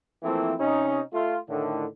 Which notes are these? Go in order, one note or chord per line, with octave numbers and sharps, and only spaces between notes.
E3 F3 A3 A#3 C4 E4
C3 C#4 D#4
A3 F4
A2 D3 D#3